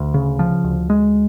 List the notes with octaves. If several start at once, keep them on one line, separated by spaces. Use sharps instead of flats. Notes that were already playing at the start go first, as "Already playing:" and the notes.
Already playing: D2
C#3
F3
D2
G#3